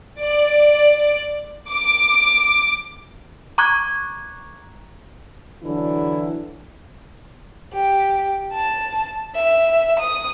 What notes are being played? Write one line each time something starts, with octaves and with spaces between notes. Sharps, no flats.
D5
D6
A#5 C#6 D6 F#6 G#6
D3 E3 F#3 D4 E4
G4
A5
E5
D#6